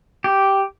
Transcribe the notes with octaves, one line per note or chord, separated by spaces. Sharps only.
G4